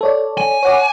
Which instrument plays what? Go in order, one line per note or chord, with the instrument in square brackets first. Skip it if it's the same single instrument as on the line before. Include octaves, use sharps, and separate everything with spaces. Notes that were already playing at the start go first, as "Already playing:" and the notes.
[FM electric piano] A4 C#5 D5
[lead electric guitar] G#5
[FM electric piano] C#5 F#5 D6